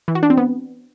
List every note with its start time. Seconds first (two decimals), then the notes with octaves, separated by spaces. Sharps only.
0.08 E3
0.15 F#4
0.23 D4
0.30 C4
0.37 B3